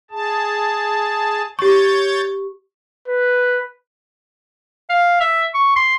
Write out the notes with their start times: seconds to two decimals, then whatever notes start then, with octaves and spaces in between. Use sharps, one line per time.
0.11 G#4 A5
1.59 G4 C#5 C#6 G6 A6
3.08 B4
4.90 F5
5.21 E5
5.54 C#6
5.76 C6